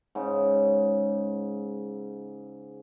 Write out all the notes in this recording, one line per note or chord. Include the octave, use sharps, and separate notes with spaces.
G#2 C#3